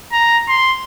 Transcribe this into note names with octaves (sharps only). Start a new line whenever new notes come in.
A#5
C6